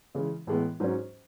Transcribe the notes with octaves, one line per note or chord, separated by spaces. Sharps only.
C#3 E3 G#3
A2 E3 G#3 B3
G#2 F#3 C#4